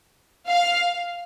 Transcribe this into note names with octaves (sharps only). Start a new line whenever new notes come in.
F5